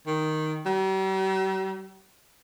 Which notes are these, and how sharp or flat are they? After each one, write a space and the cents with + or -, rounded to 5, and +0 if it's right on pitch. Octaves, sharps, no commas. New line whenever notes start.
D#3 +0
G3 -45